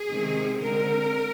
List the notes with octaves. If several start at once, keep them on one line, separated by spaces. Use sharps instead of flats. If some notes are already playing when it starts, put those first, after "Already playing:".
Already playing: G#4
C3 D#3 G#3 C4
D3 G#3 C4 A#4